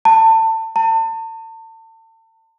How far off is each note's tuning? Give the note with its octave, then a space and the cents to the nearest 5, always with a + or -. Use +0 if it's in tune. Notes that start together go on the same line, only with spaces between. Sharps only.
A5 +25
A5 +40